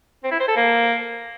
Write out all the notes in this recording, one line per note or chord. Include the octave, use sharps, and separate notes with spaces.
C4
E4
C5
A4
A#3